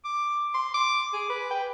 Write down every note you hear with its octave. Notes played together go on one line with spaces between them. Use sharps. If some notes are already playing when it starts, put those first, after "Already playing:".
D6
C6
D6
G#4
B4
G5